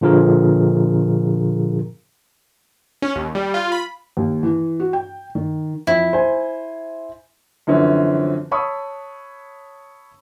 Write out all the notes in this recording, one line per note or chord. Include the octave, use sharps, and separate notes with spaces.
A#2 D3 F3 F4 G#4 A#4
C#4
D#2
G3
F4
B5
D#2
E3
F#4
G5
D#3
F2 E4
C5 G#5
F#2 D3 E3 F3 C4 C#4
C#5 A5 B5 C#6 D#6 E6